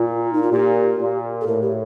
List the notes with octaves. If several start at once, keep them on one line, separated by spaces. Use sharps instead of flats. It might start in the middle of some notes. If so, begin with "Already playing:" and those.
Already playing: A#2 F4
D#4
F4
A#2 G4
A#2
A4
A2 A#4
G4